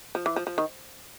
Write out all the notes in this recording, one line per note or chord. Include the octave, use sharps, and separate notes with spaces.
F3
E3
F3
F3
D#3